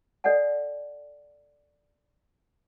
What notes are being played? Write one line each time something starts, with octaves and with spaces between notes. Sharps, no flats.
A4 D5 D#5 F#5 G#5